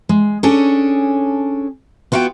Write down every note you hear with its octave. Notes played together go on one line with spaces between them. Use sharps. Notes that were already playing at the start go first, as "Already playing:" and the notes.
G#3
C#4 D4 G#4 A4 C#5
B3 F4 F#4 F5 G5